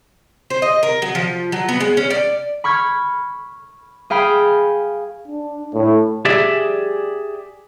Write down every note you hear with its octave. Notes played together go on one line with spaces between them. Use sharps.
C5
D#5
A#4
F#3
F3
F#3
B3
G#3
C#4
D5
B5 C#6 F6 G#6
G#4 F5 G5 B5
D4
A2
G4 G#4 D5 E5